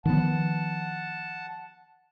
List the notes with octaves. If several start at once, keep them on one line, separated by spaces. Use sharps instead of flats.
D#3 F3 B3 F#5 A5